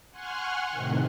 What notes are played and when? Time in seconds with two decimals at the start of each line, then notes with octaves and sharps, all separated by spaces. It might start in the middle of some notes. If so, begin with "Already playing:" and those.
0.11 F#5 G#5 C6 C#6 F6 F#6
0.71 A2 C3 D#3